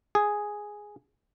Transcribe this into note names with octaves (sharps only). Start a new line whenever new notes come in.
G#4